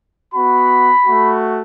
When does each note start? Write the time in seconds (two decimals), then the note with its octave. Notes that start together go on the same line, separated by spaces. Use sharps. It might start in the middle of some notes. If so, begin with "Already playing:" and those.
0.35 B3 F#4 B5
1.05 A3 F#4